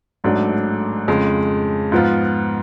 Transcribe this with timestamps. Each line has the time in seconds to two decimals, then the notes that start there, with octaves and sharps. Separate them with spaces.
0.24 A1 G#2 F#3 A3 D4
1.08 F2 C#3 G#3
1.92 G#2 F3 B3 F4